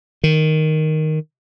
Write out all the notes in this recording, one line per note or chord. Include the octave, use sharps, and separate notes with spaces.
D#3